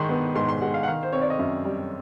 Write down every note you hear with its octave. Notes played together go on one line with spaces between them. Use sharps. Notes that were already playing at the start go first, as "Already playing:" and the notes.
Already playing: G#2 D#3 G#3 C6 C#6
B3
G#2 C6
C6
G#3 F#5
F5
F#5
D#3 F5
C5
C4 C#5
D5
D#5
F#2 E5
G3